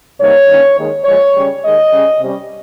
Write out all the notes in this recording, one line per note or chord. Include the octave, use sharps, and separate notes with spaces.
C3 G3 A#3 D#4 C#5
G2 D#3 A#3 C#4
D#2 D#3 G#3
A#2 F3 G#3 C#5
C#3 G3 C#4
D#2 D#3 G#3 D#5
C#3 G3 C#4
C3 G3 C#4